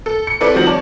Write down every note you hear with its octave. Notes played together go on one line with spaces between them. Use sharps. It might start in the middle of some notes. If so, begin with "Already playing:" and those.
A4
C#7
C4 E4 A4 B4 D5
D#3 F3 G3 C4 F#4
C#5 D5 A5